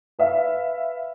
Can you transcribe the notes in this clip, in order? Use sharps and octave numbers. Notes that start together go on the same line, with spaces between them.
B4 E5 F5